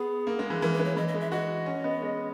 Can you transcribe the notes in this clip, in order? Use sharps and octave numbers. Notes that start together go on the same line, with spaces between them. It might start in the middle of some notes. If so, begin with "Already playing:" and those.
Already playing: B3 G#4
A#3
G#3
E3
E3 A#4
B4
G#3
C#5
E3 D#5
D#5
G#3
E5
F#4 D#5
C#4
B3
G#3